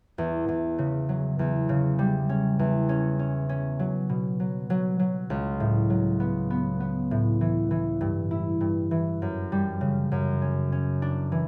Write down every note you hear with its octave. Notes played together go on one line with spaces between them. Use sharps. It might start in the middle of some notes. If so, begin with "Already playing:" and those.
E2
E2
C#3
F#3
E2
C#3
G3
C#4
E2
C#4
C#4
C#4
F#3
B2
F#3
F#3
F#3
C#2
A2
F#3
B3
B3
B3
A2
E3
E3
G2
E4
G2
E3
F#2
G3
C#3
F#2
C#4
C#4
D4
E3